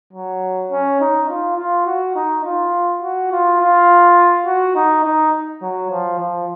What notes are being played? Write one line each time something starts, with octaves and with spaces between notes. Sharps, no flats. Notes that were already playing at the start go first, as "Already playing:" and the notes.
F#3
C#4
D#4
F4
F4
F#4
D#4
F4
F#4
F4
F4
F#4
D#4
D#4
F#3
F3
F3